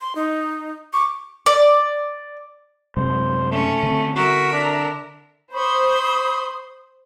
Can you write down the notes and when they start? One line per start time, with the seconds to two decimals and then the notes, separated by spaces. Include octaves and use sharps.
0.01 C6
0.15 D#4
0.93 C#6 D6
1.46 D5
2.97 F#2 C3 G#3 C5
3.52 A3 C#4
3.83 D3 C4
4.16 F#4 A#4 E5
4.53 D4
5.53 C5 B5 C#6 D#6